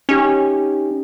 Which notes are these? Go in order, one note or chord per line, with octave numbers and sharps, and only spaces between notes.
C#4 D#4 G4